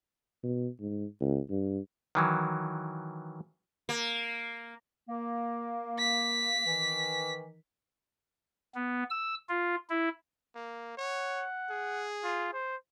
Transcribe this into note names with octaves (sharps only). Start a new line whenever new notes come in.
B2
G#2
C#2
G2
D#3 E3 F#3
A#3
A#3
B6
D#3 E3
B3
E6
F4
E4
A#3
C#5 F#5
G#4
F4
C5